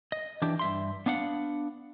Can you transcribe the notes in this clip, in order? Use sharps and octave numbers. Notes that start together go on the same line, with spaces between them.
D#5
E3 D4 G4
G2 E5 C6
B3 D4 F5 F#5